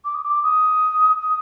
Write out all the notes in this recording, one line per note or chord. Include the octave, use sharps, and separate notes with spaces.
D6
D#6
D6
D#6
D#6